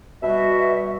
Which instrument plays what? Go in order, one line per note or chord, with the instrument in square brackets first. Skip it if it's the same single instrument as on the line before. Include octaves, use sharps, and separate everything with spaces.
[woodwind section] B2 G3 F#4 E5